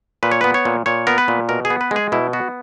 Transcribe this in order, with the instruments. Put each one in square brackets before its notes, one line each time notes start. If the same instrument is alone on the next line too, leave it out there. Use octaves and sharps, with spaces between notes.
[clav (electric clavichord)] A#2 B4
C#5
B3 B4
C#5
A#2
A#2 C#5
B3 A#4
B4
A#2
B2 A#4
G#4
B3
B4
G#3 G#4
B2 E4
B3 F#4